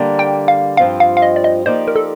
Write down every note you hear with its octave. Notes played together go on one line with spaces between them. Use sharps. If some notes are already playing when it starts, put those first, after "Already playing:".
Already playing: D3 G3 A#3
G5
F5
G2 F3 C4 F4 F5
F5
F5
D#5
D5
D#5
F3 A#3 D#4 G4 C5 D5
A#4
A4